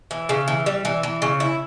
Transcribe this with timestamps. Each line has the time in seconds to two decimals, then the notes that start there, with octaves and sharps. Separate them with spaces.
0.11 E3
0.29 C#3
0.48 E3
0.66 G3
0.85 E3
1.03 E3
1.22 C#3
1.40 E4